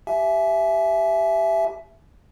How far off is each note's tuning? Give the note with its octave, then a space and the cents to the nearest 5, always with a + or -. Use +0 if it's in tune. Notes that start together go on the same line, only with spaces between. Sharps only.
G4 +0 E5 +10 G#5 +35